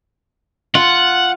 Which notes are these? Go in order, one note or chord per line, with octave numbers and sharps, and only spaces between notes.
F4 F#5